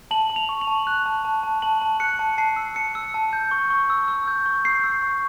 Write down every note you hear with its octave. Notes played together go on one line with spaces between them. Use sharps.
A5 F#7
A5
F7
C#6
F#7
A5
F#6
A5
A5
A5
A5 F#7
A5
F#6 C#7
A5
A5 C7
E6
A5 C#7
E6
A5
G6
C#6
C#6
E6
E6
G6
C#6
G6 C7
E6
C#6